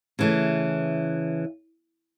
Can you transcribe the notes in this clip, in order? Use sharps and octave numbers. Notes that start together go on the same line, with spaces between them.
C#3 E3 A3